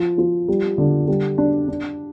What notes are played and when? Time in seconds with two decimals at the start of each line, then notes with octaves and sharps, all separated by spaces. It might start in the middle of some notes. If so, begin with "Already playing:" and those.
Already playing: F3
0.18 F3
0.48 G3
0.78 D3
1.08 G3
1.38 D4
1.68 D4